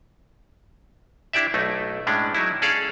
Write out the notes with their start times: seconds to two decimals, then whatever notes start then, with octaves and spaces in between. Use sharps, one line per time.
1.33 D4 E4 G4 D5 E5
1.54 B1 A3 D#4
2.07 A2 G#3 C#4 D4
2.35 F#3 D#4 E4
2.62 C#4 G#4 A4 D5 F5